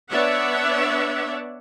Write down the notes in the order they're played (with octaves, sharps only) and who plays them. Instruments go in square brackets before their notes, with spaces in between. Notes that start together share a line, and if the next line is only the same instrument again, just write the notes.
[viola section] B3 D4 C#5 D5 E5 F#5